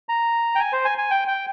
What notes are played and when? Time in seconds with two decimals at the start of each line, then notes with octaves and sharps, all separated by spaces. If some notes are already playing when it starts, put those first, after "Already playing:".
0.09 A#5
0.55 G5
0.60 G#5
0.73 C5
0.85 G#5
0.98 G#5
1.11 G5
1.28 G5